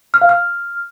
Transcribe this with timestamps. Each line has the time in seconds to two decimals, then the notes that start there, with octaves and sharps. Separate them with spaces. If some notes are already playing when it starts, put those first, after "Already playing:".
0.14 F6
0.21 F5
0.29 F6